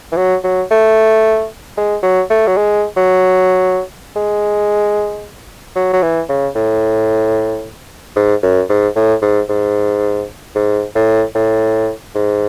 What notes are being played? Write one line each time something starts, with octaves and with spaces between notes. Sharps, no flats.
E3
F#3
F#3
A3
G#3
F#3
A3
F#3
G#3
F#3
G#3
F#3
F#3
E3
C#3
A2
G#2
F#2
G#2
A2
G#2
G#2
G#2
A2
A2
G#2